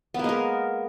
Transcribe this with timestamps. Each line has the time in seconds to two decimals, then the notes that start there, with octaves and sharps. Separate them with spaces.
0.14 B3
0.19 A#3
0.24 G#3
0.29 A#4